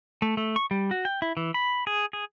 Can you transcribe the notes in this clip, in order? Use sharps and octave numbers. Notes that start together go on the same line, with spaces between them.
A3
A3
C#6
G3
F#4
G5
E4
E3
B5
G#4
G#4